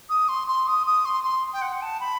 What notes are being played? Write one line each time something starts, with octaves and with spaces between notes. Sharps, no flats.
D#6
C6
C6
D#6
D#6
C6
C6
G5
F#5
A5
B5